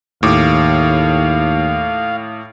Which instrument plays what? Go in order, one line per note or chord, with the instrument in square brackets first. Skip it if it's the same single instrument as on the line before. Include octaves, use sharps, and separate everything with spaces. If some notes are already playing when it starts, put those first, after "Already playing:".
[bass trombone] D#2 [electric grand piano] A2 D6 [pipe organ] F5